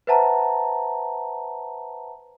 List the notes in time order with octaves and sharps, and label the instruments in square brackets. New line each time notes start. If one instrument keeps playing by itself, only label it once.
[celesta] B4 C5 E5 F#5 A5 A#5